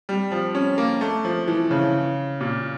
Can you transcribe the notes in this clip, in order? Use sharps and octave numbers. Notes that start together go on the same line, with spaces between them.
G3
F3
C#4
A#3
A3
F3
E3
C#3
A#2